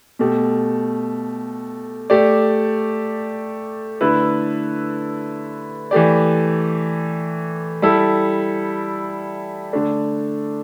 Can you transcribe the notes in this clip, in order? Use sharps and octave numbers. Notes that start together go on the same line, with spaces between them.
B2 A3 G4
A3 G4 D5
D3 A3 E4 B4
E3 A3 G4 D5
G3 E4 A4
D3 A3 D4